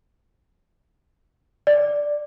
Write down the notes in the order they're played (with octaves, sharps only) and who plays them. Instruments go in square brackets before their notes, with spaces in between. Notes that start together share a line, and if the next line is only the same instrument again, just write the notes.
[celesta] D5